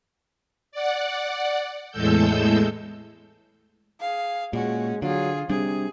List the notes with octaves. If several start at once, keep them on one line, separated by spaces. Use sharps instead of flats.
D5 F#5
E2 A2 G#3 A4 E6 G6
G#4 F5
A#2 G#3 C#4 F#4
D3 F#3 F4 G#4
C3 G3 D4 G#4